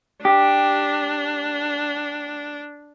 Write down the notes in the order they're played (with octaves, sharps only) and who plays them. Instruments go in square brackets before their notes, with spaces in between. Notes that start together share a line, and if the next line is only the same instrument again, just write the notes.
[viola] D4 [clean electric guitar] G4